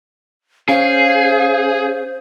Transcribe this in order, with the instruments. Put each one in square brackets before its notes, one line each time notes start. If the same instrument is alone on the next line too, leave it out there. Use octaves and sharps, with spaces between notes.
[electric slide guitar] C#4 [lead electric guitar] G#4 [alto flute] C5 [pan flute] F5